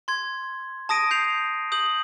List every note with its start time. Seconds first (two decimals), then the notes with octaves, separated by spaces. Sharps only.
0.08 C6 G#6
0.89 A5 D#6 A#6 D7 D#7
1.11 G6 C7 F7
1.72 D#6 G6 F#7